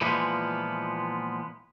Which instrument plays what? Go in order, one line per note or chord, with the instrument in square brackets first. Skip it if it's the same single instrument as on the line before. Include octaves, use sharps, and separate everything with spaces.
[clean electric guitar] A#2 E3 F3 G#3 A#3 B3